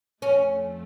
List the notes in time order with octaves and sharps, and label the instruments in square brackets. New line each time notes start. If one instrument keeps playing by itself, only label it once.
[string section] F2 F3 A3 [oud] C#4